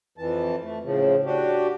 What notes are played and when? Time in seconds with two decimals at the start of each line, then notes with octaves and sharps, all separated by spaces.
0.18 F2 E3 A5
0.63 A3
0.84 A2 C#3 F3
1.25 D4 F#4 G4